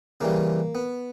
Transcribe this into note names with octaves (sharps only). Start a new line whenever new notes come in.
C#3 E3 G3 A#3
B3